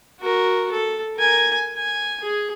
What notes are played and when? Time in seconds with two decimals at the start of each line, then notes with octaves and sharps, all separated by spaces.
0.20 F#4 A#4
0.72 A4
1.17 A#4 G#5
1.76 G#5
2.22 G#4